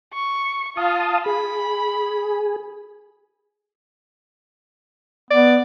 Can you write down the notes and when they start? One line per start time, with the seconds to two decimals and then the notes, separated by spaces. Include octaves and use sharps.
0.14 C#6
0.77 F4 F5 A5 D#6
1.26 G#4 B5
5.31 B3 D5